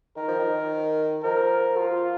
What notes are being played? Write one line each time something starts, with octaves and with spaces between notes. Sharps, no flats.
D#3 A#4
F3
D#3
F3 A#4
F4